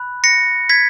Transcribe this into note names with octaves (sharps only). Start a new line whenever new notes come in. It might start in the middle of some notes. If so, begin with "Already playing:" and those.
Already playing: B5 F#6
A#6 C#7
G#6 B6